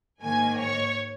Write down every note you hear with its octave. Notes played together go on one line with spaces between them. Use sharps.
G#2 D#3 A#3 G#5
C#5